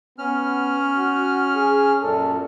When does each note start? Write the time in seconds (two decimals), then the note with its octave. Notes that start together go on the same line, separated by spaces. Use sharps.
0.18 B3 C#4 F6
0.96 F#4
1.55 G#4
2.02 F#2 A#2 A4